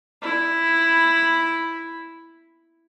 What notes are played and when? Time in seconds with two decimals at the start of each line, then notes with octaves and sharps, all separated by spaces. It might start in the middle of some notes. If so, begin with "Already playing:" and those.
0.22 E4 B5